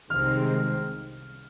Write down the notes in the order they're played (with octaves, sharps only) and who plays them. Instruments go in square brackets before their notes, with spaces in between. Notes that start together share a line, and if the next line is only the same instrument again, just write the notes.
[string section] C2 C3 D#3 G#3 C4 [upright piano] F6